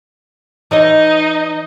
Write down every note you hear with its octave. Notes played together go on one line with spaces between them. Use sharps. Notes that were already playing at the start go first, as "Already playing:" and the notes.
E3 D#4 C#5 D#5